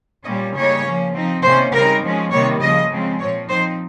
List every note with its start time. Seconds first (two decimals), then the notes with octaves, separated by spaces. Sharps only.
0.25 A#2 G3 A#3 C#4 D#5
0.55 C#3 G3 A#3 D#4 C#5
0.85 F3 A#3 C#4
1.13 F3 C4 D#4
1.43 C3 D#3 A#3 C#4 C5
1.72 C#3 G3 C4 D#4 A#4
2.02 F3 G#3 C#4
2.31 C3 D#3 G3 A#3 C#5
2.60 C#3 F3 A#3 D#5
2.89 C#3 F3 G#3 C4
3.19 A#2 F3 C4 C#5
3.48 F3 C4 D#4 C5